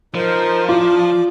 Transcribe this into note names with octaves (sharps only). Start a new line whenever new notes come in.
F3 D#4 A#4 C5
F4 D5 D6